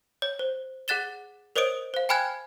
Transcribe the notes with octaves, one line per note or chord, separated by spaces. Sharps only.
C#5
C5
G#4 F#5 F#6 A6 E7 G7
A#4 C5 C#5 D#5 D#6 D7
C5 F5
G5 G#5 B5 F6 F#6 G#6